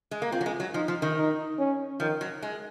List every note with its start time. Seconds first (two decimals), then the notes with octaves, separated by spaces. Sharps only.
0.11 G#3
0.22 A#3
0.32 C4 F4
0.41 F#3
0.46 G#3
0.60 F#3
0.74 F3 D#4
0.88 F3
1.02 D#3
1.16 D#4
1.59 C#4
2.00 D#3 F3
2.21 F#3
2.42 G#3